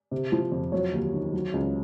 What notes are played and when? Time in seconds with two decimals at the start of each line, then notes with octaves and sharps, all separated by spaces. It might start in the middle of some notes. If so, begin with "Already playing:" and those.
0.11 C3
0.32 F3
0.52 F2
0.72 F#3 C#5
0.93 D#2
1.14 D#3
1.33 F#3
1.54 C#2